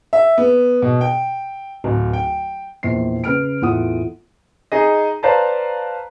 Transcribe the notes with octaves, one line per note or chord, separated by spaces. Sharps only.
E5
B3
B2
G5
D1
G5
A#1 E2 C5 C7
C#3 B4 F6 D7
E2 A2 F4 F#5 D#6
D#4 G#4 D#5
B4 C5 D5 F5 A5 A#5